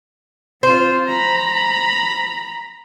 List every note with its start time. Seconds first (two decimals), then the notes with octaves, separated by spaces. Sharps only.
0.63 C4 F4 C5
1.08 A#5 B5